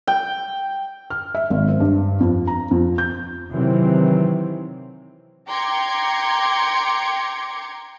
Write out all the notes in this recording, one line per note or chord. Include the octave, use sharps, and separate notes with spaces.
G5
F6
E5
G#1
C4
G2
F2
A#5
F2
G6
C3 D#3 E3 F#3 C4
G5 A#5 C6 D6 G#6 C#7